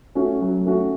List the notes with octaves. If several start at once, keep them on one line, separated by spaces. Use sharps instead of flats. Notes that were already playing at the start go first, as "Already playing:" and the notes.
A3 C#4 F#4
F#3
A3 C#4 F#4